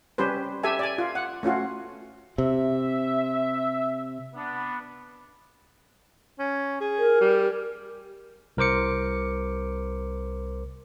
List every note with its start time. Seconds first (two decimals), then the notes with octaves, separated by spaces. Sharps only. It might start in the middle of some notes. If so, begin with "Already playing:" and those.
0.18 G3 C#4 G4 B4 C5
0.63 G4 A4 E5 G#5
0.79 D5 G#5
0.98 F4
1.15 F#5
1.43 A3 C#4 F4 F#4
2.38 C3 E5
4.35 B3 D4
6.39 C#4
6.80 G#4
6.98 A#4
7.21 G3
8.57 C2 A#4 C5 D6 C#7